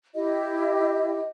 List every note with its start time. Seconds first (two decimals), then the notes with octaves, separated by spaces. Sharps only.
0.15 E4 G4 D#5